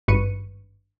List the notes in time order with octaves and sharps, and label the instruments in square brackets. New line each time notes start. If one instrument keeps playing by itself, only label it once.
[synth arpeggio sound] G#1 G2 B4 C#6 C#7 D#7